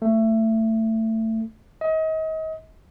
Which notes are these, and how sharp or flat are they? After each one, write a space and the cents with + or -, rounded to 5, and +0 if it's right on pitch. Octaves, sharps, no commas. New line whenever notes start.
A3 +20
D#5 +35